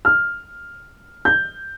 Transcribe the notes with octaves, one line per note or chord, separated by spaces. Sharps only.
F6
G6